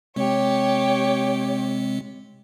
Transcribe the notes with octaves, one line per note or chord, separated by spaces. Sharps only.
C3 G#3 C4 G4 C#5